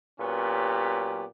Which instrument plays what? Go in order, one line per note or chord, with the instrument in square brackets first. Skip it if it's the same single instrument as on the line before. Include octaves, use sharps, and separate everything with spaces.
[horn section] A#2 F#3 B3 C#4 G4